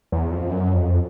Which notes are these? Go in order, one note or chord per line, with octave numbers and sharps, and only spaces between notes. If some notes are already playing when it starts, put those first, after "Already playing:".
E2
F2
F#2
F2